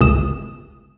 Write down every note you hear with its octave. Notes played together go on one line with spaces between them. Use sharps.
G1 C#2 C#3 D#6 E7